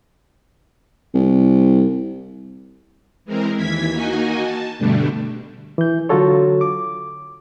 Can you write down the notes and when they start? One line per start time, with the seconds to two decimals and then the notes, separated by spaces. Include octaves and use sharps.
1.14 C2
3.25 E3 G#3 C4 A#4
3.55 D#2 E3 G#6 B6
3.92 A#3 D#4 F#4 D#5 G#5
4.43 A5
4.78 G2 B2 D3 G3 A3 D4
5.78 E3 G6
6.09 D3 F#3 F4 F#4 A4 C#5
6.61 D6